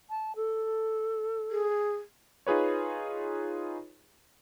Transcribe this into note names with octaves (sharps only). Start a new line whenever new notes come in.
A5
A4
G#4
D#4 F4 G#4 B4 C#5